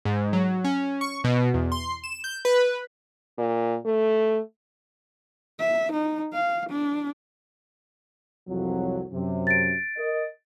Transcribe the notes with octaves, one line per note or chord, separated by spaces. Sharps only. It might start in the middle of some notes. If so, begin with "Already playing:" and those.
G#2
F#3
C#4
C#6
B2
E2
C6
E7
G6
B4
A#2
A3
E5
D#4
F5
D4
C2 F2 F#3
F#2 C3
A6 D7
A#4 D#5